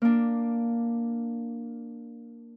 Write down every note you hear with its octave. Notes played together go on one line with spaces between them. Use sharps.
A#3 D4